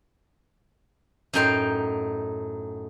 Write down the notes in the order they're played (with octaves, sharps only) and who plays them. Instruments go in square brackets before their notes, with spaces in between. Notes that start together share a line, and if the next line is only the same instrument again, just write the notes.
[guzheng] F#2 A2 D#4 G5 C6